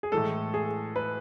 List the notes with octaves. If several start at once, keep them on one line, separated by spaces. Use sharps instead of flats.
G#4
A2 E3 G#3 A4
G#4
B4